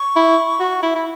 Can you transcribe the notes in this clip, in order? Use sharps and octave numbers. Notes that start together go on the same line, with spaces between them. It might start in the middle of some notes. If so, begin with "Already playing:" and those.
Already playing: C#6
E4
F#4
E4
E4